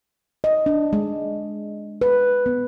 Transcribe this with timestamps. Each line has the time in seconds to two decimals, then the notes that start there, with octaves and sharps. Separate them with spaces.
0.44 D#5
0.66 D4
0.93 G#3
2.01 B4
2.46 B3